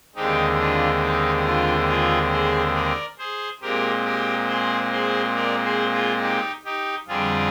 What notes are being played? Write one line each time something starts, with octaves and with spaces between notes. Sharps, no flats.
D#2 D3 G#3 C4 D#4 G4
D4 F4
D#4
D4 F4
F4 G#4
G#4 C5
A#4 D5
G#4 C5
A#2 G#3 C4 G4 A#4
G4 A#4
G#4 C5
G#4 C5
A#4 D5
G#4 C5
F4 G#4
D#4 G4
D#4 G4
F2 D3 G3 C4 F4 G#4